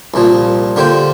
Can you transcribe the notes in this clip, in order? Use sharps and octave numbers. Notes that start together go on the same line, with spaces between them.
C2 A#2 F3
D3 A#3 G4 C5